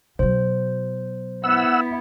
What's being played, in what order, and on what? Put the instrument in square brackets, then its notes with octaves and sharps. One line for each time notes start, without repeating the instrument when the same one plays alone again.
[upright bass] B2 F#3 [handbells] C5
[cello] B3 E4 [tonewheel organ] F#5 E6